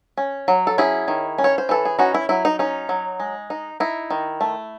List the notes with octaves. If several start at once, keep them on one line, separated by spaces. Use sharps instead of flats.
C#4
F#3
A4
C#4 E4 G#4
D#3
C#4
C#5
C5
E3 A4
G#4
C#4 D#4 F#4
E4
F#3 E4
D#4
C#4 D#4
F#3
G#3
D#4
D#4 E4
D#3
A3